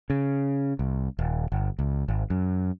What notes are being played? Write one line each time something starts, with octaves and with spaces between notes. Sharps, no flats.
C#3
C2
D#1
G1
C#2
G#1
F#2